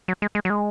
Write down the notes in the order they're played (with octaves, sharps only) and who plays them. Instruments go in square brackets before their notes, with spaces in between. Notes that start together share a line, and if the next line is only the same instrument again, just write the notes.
[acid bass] F#3
G#3
G#3
F#3
G#3